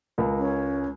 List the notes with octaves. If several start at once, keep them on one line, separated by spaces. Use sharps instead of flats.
C#2 A#4
C#4